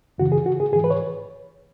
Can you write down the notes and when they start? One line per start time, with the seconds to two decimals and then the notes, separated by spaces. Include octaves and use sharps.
0.18 F#2 C#3 E3 F#4
0.32 G#4
0.46 F#4
0.60 G#4
0.72 G#2 G#4
0.76 E3
0.84 B4
0.90 C#5